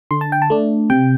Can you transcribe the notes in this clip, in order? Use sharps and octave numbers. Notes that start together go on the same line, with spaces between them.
D3 C6
A5
G5
A5
A3 D4
C3 G5